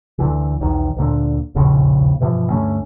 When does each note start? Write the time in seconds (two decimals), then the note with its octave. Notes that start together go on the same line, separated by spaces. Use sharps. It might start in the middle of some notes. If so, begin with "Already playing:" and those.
0.19 D2 D3 E3
0.60 B1 E2 D#3
0.97 D2 A#2 D3
1.55 E1 A#1 D#2 C#3
2.20 G2 B2 E3 F3
2.50 D2 G2 A3 C#4